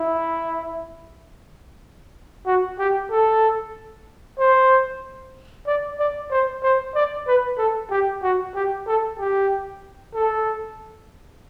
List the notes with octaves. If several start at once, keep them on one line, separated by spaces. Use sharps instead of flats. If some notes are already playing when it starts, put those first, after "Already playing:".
Already playing: E4
F#4
G4
A4
C5
D5
D5
C5
C5
D5
B4
A4
G4
F#4
G4
A4
G4
A4